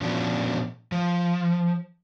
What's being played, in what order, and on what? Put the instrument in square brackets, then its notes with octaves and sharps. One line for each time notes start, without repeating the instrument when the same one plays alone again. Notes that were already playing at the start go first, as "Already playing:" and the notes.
[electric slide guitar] A#2 F3 B3 C#4 D4 F#4
F3